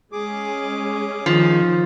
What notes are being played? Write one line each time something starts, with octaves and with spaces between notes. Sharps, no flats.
G#3 C#4 G#4 D6
D#3 F3